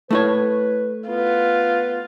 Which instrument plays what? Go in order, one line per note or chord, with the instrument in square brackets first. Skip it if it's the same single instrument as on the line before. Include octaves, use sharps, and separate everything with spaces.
[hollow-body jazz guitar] A3 E4 C#5 [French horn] B4
[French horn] B3 [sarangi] F4